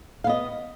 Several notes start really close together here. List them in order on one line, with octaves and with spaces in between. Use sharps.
F5 B3 D#5